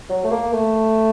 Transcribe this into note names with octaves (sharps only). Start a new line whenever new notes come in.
F#3
A3
A#3
A3